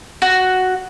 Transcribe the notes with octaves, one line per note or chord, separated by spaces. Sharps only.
F#4